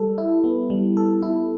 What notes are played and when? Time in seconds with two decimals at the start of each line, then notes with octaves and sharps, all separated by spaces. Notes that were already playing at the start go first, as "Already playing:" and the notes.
Already playing: G3 A4
0.18 E4
0.44 B3
0.70 G3
0.97 A4
1.22 E4